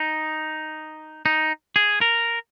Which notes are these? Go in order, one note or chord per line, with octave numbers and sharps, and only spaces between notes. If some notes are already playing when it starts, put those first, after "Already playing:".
Already playing: D#4
D#4
G#4
A#4